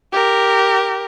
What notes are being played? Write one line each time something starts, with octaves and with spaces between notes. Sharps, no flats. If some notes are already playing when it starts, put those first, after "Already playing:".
G4 A#4